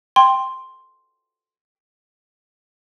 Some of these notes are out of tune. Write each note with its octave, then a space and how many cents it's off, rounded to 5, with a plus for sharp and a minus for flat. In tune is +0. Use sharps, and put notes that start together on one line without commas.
G5 +5 C6 +0